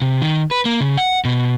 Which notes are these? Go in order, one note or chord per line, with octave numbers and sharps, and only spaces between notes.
C3
D#3
B4
A#3
C#3
F#5
B2